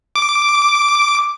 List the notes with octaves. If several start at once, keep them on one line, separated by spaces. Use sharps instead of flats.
D6